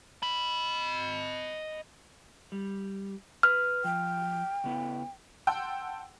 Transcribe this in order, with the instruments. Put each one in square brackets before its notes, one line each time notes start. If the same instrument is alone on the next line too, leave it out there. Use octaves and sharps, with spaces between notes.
[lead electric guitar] D#5 B5
[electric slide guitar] G3
[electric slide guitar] B4 [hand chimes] F6
[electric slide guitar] F3 [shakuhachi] G5
[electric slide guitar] C#3 B3 E4
[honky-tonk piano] F#5 G5 A5 C6 E6